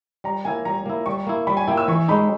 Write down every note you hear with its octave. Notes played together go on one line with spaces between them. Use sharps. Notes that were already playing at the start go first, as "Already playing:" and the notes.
G3 A#5
A#3 E4 G#5
G3 A#5
A#3 E4
G3 C#6
A#3 E4
G3 B5
G#5
A#3 E4 G5
E6
E3 C#6
G#3 D#4 B5